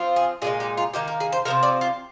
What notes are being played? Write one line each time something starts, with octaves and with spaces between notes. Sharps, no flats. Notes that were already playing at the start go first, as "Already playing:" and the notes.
Already playing: F3 C4 F4
G#4
A#2 G#3 D#4 G#4
G4
F4
D#3 A#3 D#4 G4
A#4
G#4
C5
C3 F3 C4 A#4
D5
F4